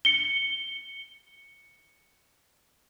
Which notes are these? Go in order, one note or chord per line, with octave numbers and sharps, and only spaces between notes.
C#7 G7